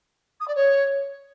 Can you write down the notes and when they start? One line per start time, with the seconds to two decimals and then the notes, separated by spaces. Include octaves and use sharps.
0.40 D#6
0.48 D5
0.55 C#5